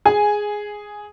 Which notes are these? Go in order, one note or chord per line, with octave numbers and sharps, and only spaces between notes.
G#4 G#5